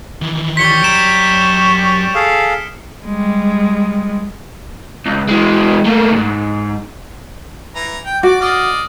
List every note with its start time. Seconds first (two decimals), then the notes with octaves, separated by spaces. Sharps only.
0.22 D#3 E3
0.57 G3 C#5 B6 C#7 G7
0.83 F#2 A#5 D7 E7
2.15 G#4 A4 F5
3.06 G3 G#3
5.06 C#2
5.28 E3 G#3
5.86 A3 A#3
6.13 C#2 G#2
7.75 E3 A#5
8.05 G5
8.23 F#4 D5 D6
8.41 D5 D#5 F5